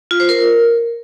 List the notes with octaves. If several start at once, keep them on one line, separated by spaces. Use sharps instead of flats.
F4
C5
A#4